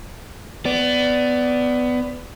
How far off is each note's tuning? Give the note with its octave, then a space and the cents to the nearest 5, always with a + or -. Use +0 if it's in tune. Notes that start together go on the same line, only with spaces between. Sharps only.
B3 +20 D5 -5